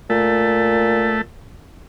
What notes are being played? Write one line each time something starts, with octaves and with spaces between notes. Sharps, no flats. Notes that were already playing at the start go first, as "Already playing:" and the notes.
A#2 A3